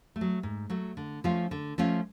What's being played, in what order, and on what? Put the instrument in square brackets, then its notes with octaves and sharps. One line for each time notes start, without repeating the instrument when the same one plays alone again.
[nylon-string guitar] A3
F#3
G#2
F#3 A3
D3
F3 A3 C#4 F4
D3
F3 A3 C#4 F4